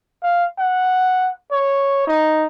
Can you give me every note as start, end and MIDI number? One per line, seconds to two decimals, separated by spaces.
0.23 0.45 77
0.58 1.32 78
1.51 2.06 73
2.07 2.47 63